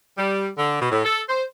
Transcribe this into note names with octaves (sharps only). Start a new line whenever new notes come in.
G3
D3
B2
A2
A4
C5